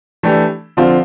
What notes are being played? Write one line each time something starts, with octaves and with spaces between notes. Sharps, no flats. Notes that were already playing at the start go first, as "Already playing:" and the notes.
E3 A3 D4 G4
D3 F3 C4 F4